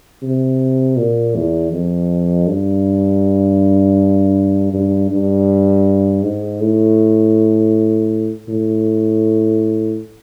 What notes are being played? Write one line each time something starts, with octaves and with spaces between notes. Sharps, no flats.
C3
A#2
E2
F2
G2
G2
G2
G#2
A2
A2